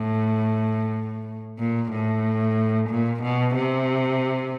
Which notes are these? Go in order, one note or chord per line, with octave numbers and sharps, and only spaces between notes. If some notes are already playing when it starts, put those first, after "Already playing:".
Already playing: A2
A#2
A2
A#2
B2
C3